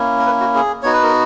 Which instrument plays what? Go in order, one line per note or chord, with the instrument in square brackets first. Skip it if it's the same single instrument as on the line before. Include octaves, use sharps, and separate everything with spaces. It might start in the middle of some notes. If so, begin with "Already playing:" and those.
Already playing: [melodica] A#3 C#4 E4
A#4
B4
F#4
G#4
B3 D#4 F#4 C#5
B4
A#4